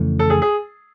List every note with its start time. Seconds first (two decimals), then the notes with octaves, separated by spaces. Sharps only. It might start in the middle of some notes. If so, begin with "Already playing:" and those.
Already playing: F2 C#3 E3 A3
0.19 A4
0.30 G#4
0.42 G#4